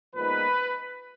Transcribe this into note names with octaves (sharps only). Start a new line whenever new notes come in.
A#2 F3 G#3 B3 D#4 B4